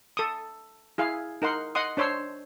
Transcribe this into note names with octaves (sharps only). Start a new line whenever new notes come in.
A4 D#6
E4 G#4 F5
D#4 A#4 F#5 C6
D#5 F#5 C6 D#6
D4 C5 C#5 C6 E6